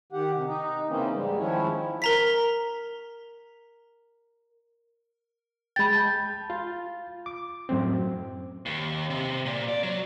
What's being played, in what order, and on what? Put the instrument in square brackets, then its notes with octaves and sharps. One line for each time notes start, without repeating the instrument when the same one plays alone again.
[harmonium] D#3 G4 F#5
C3
D#4
A#2 C#3 E3 A#3 C4 C#4
G#2 G3 G#3
D#3 F3 G#3 C#4 E4 C#5
[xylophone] A#4 A#5 B6
[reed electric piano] G#3 G5 [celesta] B5 A6
[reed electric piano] A5 G6
F4
D6
F#2 A2 C4
[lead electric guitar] D#2
C3
A#2
D5
F#3